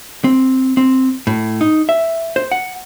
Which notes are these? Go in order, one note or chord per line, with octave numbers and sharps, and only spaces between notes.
C4
C4
A2
D#4
E5
C5
F#5